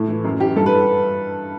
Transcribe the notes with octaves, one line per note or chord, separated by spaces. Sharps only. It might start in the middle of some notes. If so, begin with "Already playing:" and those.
Already playing: A2
E3
F#2
E3 G4
G2 A4
B4